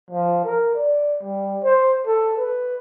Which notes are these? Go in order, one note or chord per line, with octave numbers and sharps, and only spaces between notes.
F3
A#4
D5
G3
C5
A4
B4